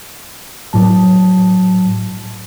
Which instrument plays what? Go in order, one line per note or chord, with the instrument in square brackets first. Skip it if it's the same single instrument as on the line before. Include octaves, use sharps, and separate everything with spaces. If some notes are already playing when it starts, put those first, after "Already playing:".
[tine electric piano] A2 F#3 A5